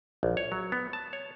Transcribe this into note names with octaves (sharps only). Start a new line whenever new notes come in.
A#1
C#5
F#3
B3
A5
C#5